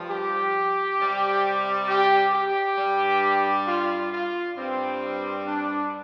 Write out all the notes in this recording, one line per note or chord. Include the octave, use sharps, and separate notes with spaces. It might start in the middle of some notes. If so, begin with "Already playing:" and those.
Already playing: G2 F3
G4
C3 G3
G4
G4
G2 G3
F4
F4
G2 G3 C4
D4